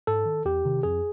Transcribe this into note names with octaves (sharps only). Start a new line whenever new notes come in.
G#2 A4
D#3
E2 G4
C3 D#3
F2 G#4